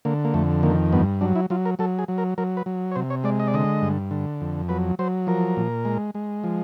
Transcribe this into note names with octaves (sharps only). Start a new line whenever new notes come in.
D3 A#3
A#3
F2 A3
D#3 A#3
G2 B3
F#3 D4
E4
F#3 F4
A#4
F#3 A4
G#4
F#3
A#4
F#3 A#4
B4
F#3
C#5
C3 C5
C#5
G#3 D5
D#5
D5
D3 D#5
G2
D3
F2
F#3 B4
F#3 C5
F3 A#4
A#2
G#3
G#3
F3